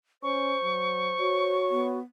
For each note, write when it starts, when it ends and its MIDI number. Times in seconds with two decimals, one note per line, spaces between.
0.23 0.55 61
0.23 1.53 72
0.23 1.87 85
0.63 1.14 54
1.19 1.99 66
1.19 1.97 73
1.70 1.99 59